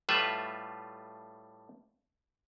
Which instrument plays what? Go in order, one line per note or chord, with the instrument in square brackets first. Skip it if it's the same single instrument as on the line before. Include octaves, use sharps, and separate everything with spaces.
[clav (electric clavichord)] A2 G3 A3 F4 B4 E5